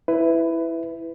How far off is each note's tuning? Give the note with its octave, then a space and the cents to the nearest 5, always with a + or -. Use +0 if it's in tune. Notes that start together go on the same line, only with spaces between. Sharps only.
E4 +0 B4 +15